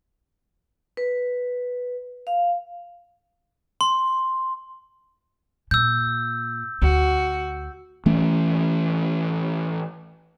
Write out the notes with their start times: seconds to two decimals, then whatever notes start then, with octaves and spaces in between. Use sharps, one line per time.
0.97 B4
2.27 F5
3.81 C6
5.71 A#2 E6 G6
6.82 D2 F#4
8.06 E3 A3 C#4